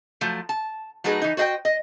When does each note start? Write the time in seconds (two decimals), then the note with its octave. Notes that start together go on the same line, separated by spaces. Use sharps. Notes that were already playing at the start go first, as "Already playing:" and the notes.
0.21 F3 F#3 A3
0.49 A5
1.04 F#3 A3 D#4 G#4 B4
1.22 E3 D#4
1.37 F#4 C5 D#5 F5 G5
1.65 D#5